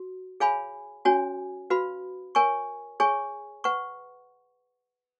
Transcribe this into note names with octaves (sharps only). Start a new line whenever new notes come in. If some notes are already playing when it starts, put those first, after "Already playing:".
Already playing: F#4
G#4 C#5 F5 G#5 B5
C#4 F#4 C#5 G#5
F#4 B4 F5 B5
A#4 C#5 G#5 C#6
G#4 C#5 G#5 C#6
B4 F#5 C#6